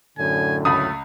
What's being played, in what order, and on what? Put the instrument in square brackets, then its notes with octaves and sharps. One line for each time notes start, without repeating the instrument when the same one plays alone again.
[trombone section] F#2 A2 D3 [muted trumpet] G#5
[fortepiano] C#2 B5 [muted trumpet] A3 [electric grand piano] D#6